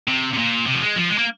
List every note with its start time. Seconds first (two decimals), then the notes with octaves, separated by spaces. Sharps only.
0.08 C3
0.33 C3
0.38 A#2
0.66 C3
0.74 F3
0.81 G#3
0.96 F3
1.10 G#3
1.18 A#3